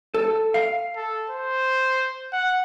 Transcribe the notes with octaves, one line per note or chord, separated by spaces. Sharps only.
A4
F5
A4
C5
F#5